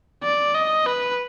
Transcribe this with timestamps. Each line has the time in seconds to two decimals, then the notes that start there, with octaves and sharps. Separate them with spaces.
0.24 D5
0.55 D#5
0.87 B4